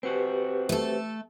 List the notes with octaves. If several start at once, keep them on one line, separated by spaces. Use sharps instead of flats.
C4 F#4 G4 B4
A3 A4